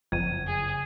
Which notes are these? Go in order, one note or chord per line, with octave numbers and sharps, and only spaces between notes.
F#1 F2 G#6 D#7
G#4